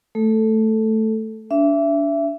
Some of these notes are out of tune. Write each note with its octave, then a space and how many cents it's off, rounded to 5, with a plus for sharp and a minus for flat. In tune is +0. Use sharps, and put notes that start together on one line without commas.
A3 +0 A4 +0
D4 -25 E5 +20